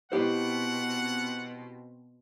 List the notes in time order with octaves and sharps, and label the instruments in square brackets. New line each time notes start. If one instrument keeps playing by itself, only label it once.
[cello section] B2 C4 [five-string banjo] E4 G4 C5 [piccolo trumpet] F#5